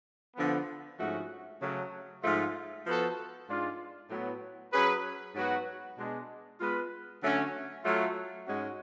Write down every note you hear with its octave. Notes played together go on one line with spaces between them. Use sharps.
D3 F3 B3
G#2 F3 A3 C#4 F#4
C#3 F#3 A3
G#2 F3 A3 F4
F3 B3 F#4 A4
G#2 G#3 D4 F4
A2 F#3 B3
F#3 C#4 G#4 B4
G#2 F#3 B3 F#4 B4
B2 G#3 D4
G#3 B3 F4 B4
D3 F#3 A3 C#4
F#3 A3 F4
G#2 G#3 C#4 F#4